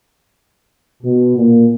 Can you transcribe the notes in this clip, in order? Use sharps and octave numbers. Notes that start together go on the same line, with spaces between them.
B2
A#2